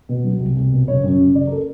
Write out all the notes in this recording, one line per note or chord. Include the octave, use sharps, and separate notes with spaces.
B2
F#3
C2
C2
B2
F#1 C#5
F#2
C#3
F#1 D5
A#4
A4